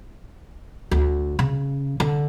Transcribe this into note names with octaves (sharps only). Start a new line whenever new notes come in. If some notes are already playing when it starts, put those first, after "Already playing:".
D2
C#3
D3